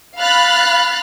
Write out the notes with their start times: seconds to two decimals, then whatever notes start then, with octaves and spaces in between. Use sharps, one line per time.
0.18 F5 B5 F6 F#6 A6